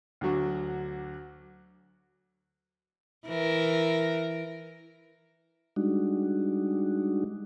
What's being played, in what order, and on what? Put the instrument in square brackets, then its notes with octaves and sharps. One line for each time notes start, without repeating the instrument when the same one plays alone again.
[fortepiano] D2 D3 F#3 F#4
[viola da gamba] E3 A#4
[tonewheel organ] G3 G#3 D4 D#4 F#4